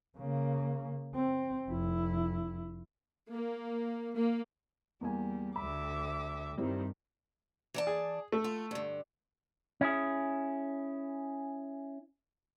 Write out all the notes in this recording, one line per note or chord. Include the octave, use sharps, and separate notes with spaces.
C#3 A#3
C4
F1 E4
A#3
A#3
E2 G3 A#3 G#5
D2 E5 B5 D6
G2 D#3 G3 C4 E4
E3 D5 A5
G#4
A3 A4
F4
G2 D3
C#4 E4 G#4